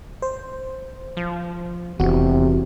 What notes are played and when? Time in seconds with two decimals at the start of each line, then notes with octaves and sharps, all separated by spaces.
0.22 C5
1.17 F3
2.00 D#1 E2 C3 F#4